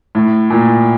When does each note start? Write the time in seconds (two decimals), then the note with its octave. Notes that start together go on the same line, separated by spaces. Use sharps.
0.15 A2
0.50 A#2